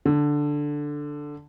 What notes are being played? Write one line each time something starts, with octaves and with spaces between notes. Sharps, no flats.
D3